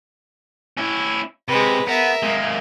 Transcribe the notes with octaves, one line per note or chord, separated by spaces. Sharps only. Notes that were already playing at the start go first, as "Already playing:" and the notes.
C#4 E4
C3 G#3 B4
B3 A#4 E5
G#3 A#3